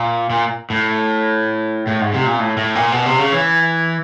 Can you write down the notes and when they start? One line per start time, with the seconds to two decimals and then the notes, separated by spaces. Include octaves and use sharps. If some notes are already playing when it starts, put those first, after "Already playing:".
Already playing: A#2
0.30 A#2
0.70 A2
1.87 A2
2.01 G#2
2.14 C3
2.26 A#2
2.40 A2
2.57 A2
2.75 A#2
2.92 B2
3.06 C3
3.19 C#3
3.32 E3